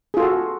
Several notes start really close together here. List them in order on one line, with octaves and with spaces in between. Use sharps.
G#4 F4 A4 F#4